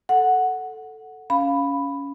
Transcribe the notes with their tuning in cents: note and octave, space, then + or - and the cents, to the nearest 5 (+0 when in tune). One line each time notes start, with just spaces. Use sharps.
A4 +0 F#5 +0
C#4 +15 F5 +0 B5 +0